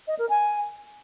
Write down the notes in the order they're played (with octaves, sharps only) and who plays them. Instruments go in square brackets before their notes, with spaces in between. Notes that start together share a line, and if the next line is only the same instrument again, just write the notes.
[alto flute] D#5
A#4
G#5